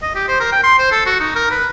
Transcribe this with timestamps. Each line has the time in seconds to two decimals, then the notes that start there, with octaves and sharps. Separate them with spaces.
0.02 D#5
0.15 G4
0.28 C5
0.40 A#4
0.52 G5
0.63 C6
0.78 C5
0.92 A4
1.06 F#4
1.20 D#4
1.35 A#4
1.51 B4